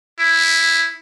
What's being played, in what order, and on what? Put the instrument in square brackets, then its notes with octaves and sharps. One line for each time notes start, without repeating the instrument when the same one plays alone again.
[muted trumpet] E4